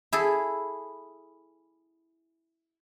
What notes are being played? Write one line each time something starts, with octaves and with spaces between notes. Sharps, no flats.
E4 G#4 A4